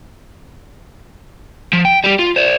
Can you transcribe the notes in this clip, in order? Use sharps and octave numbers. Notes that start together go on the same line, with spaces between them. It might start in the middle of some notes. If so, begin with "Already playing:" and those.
F3
G5
G3 G4
F4
C5 D5